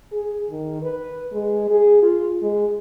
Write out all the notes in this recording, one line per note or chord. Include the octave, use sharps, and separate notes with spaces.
G#4
D#3
B4
G#3
G#4
F4
G#3